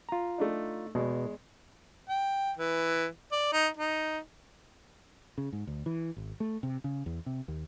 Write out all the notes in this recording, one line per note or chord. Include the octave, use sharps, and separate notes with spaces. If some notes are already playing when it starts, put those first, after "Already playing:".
F4 A#5
A3 D4 D#4
E2 B2 G#3
G5
E3
D5
D#4
D#4
C#3
G#2
D2
E3
G#1
A3
C3
C#3
E2
C3
D#2